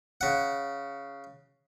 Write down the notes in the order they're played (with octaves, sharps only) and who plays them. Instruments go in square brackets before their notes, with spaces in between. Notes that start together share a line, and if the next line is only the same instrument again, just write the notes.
[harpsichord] C#3 F#5